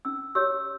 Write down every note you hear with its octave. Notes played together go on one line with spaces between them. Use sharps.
C#4 E6
G4 C#5 E6